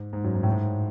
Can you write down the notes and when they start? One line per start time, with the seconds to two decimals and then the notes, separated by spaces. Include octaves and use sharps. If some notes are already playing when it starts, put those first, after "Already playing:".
Already playing: G#2
0.13 G#2
0.24 F#2
0.35 G#2
0.43 A2
0.52 G#2